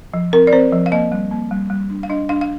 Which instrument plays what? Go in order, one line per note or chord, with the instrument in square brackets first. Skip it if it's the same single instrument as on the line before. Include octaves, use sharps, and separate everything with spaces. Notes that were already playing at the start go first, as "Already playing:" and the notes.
[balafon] F3
C4 A#4
D5
C4 C5
F3
F5
A#3 D#5
G3
A#3
G3
G3
D4
F5
D4 D#5
D4 F5
F5